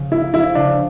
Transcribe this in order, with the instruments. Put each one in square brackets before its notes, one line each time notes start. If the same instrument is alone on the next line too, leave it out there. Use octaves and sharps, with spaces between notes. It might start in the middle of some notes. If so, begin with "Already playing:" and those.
Already playing: [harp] C#3 F3
[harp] A#3 [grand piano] E4
[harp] F3 [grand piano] E4
[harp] C#3 [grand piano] D4